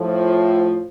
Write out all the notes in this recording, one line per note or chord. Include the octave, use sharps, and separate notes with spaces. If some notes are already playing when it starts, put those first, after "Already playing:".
Already playing: A2 F3